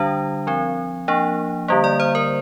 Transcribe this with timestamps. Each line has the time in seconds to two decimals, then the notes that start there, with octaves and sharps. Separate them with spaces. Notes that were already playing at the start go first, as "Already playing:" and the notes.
Already playing: D3 G3 D4
0.47 F3 C4
1.08 F3 A#3 D4
1.68 D3 G3 A#3
1.84 D5
2.00 C5
2.15 A#4